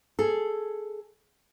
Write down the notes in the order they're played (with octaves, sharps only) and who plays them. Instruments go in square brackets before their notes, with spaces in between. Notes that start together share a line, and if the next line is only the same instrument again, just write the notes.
[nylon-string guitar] G#4 A4